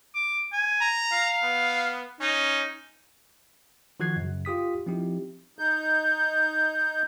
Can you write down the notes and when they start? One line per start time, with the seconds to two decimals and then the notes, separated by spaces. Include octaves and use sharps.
0.15 D6
0.53 G#5
0.81 A#5
1.12 F5
1.43 B3
2.21 C#4 D#4
4.00 D#3 F3 F#4 F#6 G#6 C7
4.16 F#2 C#3
4.45 F4 G4 D#6 B6
4.86 F3 C4 D#4 E4 G4
5.59 D#4 G6